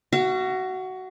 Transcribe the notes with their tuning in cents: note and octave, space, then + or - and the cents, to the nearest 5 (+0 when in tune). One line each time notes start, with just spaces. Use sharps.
F#4 +15 F5 -40